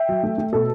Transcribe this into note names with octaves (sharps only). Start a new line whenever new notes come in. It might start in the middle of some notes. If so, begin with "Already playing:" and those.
Already playing: E5 G5
F#3
A3
A3
B2 A4